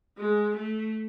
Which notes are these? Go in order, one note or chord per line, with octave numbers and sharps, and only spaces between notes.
G#3
A3